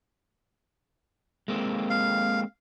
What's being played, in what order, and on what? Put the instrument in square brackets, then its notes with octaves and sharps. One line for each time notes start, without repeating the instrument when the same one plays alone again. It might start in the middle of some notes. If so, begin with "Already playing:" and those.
[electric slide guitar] G#3 A#3 C4
[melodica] F5